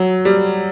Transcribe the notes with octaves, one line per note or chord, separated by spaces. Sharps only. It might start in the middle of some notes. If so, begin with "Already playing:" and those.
Already playing: F#3
G3